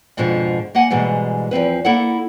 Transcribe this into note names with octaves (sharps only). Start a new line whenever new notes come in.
F2 G#2 B2 D3 F3
A#3 D#5 F#5 G#5
G#2 B2 E3 G3 G#3
E2 F3 C4 B4
A#3 E4 A4 F#5